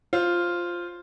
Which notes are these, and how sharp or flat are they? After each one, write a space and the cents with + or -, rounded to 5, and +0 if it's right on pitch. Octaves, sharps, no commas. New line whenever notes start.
F4 +0 C5 +0